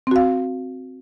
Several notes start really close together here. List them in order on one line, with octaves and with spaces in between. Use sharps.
C4 F#4 F5